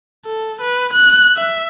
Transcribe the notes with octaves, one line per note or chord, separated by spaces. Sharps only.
A4
B4
F#6
E5